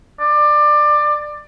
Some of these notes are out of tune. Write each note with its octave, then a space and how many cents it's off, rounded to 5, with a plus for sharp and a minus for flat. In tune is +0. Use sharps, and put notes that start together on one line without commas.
D5 +20